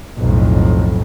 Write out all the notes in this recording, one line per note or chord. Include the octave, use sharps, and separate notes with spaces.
B1 F2 A2